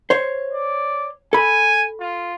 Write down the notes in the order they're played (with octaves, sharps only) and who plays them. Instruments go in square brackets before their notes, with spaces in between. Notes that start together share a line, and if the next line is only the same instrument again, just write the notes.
[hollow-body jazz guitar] C5 C#5
[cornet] D5
[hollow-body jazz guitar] A4 B5 [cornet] G#5
[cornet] F4